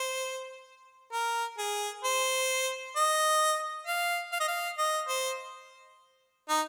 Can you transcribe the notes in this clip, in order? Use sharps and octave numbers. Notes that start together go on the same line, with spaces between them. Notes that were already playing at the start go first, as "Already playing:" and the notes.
Already playing: C5
A#4
G#4
C5
D#5
F5
F5
D#5
F5
D#5
C5
D#4